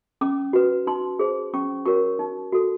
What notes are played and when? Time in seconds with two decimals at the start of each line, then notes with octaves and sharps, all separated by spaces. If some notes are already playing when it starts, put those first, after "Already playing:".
0.21 C#4 D6
0.53 F#4 B4
0.87 D#4 C6
1.19 G#4 C5
1.54 C#4 C#6
1.86 F#4 A#4 C#5 C#6
2.19 D#4
2.52 F#4 A4